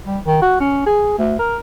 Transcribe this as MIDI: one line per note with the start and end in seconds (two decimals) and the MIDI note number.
0.06 0.19 55
0.25 0.41 51
0.42 0.57 66
0.60 0.84 61
0.86 1.14 68
1.18 1.39 38
1.39 1.57 70